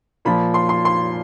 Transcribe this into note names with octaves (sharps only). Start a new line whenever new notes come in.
A#2 F3 B5
C6
C6
C6